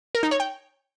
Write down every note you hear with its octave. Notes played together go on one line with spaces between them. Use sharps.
A#4
D#4
C#5
G5